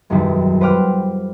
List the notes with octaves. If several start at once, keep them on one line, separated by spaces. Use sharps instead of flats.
E1 B1 F#2 D#3 G3
B4 C5 F#5 G5 D6 F6